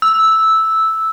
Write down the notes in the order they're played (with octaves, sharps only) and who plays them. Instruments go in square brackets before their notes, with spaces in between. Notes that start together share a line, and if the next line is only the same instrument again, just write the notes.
[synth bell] E6